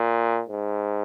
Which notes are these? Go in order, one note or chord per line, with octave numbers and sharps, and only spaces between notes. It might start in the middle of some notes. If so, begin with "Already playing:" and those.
Already playing: A#2
G#2